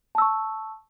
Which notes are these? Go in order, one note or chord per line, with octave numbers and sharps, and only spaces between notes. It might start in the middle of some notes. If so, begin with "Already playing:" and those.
A5 C#6 E6